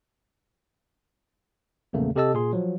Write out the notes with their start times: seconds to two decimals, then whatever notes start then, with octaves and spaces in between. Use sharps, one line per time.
1.93 A#1 E2 C#3 A3 A#3
2.16 C3 G4 A4 D#5 A5 E6
2.34 A#2 G#4 C6
2.53 F3 F#3